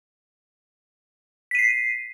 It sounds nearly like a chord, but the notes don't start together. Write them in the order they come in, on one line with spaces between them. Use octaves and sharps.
B6 D#7 C7